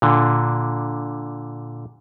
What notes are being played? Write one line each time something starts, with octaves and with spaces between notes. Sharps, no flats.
A#2 D3